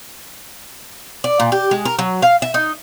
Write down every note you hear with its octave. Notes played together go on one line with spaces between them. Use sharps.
D5
A#2
G4
G#3
A#4
F#3
F5
E5
D#4